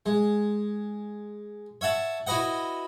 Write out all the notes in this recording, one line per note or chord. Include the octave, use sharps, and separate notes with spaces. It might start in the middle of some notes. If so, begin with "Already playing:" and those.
G#3
C#5 E5 F#5 A5
E4 F#4 B4 D#5 F#5